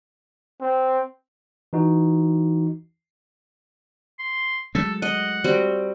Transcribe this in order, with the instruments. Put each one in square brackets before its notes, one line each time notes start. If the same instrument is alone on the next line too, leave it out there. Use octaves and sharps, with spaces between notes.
[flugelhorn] C4
[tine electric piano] E3 D#4 F#4
[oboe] C6
[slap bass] F#3 G#3 A3 [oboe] A4
[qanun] D#5 [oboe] F#5
[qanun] G3 C4 F#4